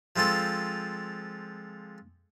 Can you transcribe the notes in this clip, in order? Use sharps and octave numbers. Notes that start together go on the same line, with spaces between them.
F3 G#3 C4 F4 A4